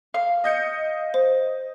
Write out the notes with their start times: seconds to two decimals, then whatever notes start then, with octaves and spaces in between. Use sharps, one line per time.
0.14 F5
0.44 D#5 G6 C#7
1.14 C5